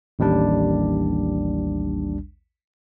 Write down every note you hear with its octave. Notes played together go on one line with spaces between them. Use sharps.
A1 D#2 G3 D4